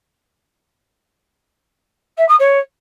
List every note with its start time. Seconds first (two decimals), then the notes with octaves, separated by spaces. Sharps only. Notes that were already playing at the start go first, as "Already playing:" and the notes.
2.17 E5
2.28 D#6
2.39 C#5